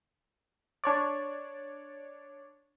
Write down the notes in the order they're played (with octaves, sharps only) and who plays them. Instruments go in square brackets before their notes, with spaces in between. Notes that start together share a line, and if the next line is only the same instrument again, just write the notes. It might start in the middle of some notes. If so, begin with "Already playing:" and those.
[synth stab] D4 C#5 D5